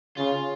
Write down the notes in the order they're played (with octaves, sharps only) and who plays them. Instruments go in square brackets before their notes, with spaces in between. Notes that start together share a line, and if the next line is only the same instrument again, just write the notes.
[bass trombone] C#3 [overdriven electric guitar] F4